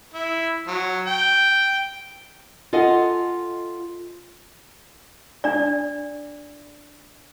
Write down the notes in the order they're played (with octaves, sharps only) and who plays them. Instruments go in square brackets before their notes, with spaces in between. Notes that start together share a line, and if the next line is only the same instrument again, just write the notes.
[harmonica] E4
F#3
G5
[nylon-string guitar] F4 A4 D#5 F#5 G#5
[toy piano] D4 D5